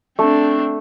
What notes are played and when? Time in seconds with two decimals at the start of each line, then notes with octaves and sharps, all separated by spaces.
0.19 A3 C4 D4